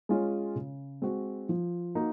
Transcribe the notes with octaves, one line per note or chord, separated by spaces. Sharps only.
G#3 C#4 F4
C#3
G#3 C4 F#4
F3
A#3 D#4 F#4